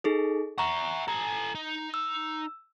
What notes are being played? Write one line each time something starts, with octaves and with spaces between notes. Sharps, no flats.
D#4 G#4 A4
E5 F#5 A#5 C#6
A4 G#5 A#5
D#4
E6